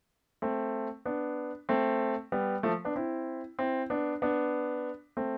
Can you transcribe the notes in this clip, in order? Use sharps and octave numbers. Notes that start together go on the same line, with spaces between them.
A3 C4
B3 D4
A3 C4
G3 B3
F3 A3
B3 D4
C4 E4
C4 E4
B3 D4
B3 D4
A3 C4